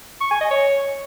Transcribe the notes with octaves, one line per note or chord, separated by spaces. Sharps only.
C#6
G#5
D#5
C#5